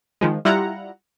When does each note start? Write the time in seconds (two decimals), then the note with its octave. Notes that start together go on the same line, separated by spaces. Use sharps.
0.21 D#3 F3 G#3
0.45 G3 E4 F4 F#5 A#5